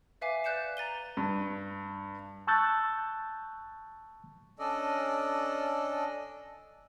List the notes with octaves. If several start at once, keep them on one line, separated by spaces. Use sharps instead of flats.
B4 E5 F5 G#5 D6
B4 D5 F#6 G6 C#7 E7
A#5 A6 D#7 G7
G2
A5 C#6 E6 F#6 G6 A6
C#4 D4 A4 D5 D#5